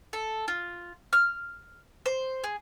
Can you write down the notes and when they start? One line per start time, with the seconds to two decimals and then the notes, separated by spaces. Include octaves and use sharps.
0.13 A4
0.48 F4
1.13 F6
2.06 C5
2.44 G#4